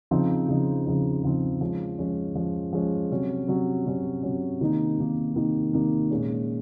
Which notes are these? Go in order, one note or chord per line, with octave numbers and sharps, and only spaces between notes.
C#3 F3 C4 D#4
C#3 F3 C4 D#4
C#3 F3 C4 D#4
C#3 F3 C4 D#4
F3 G#3 C#4
F3 G#3 C#4
F3 G#3 C#4
F3 G#3 C#4
C3 F#3 C#4
C3 F#3 C#4
C3 F#3 C#4
C3 F#3 C#4
C3 D#3 A#3 D#4
C3 D#3 A#3 D#4
C3 D#3 A#3 D#4
C3 D#3 A#3 D#4
A#2 G#3 C#4